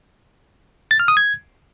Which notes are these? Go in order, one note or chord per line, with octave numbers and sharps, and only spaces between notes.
A6
F6
D#6
G#6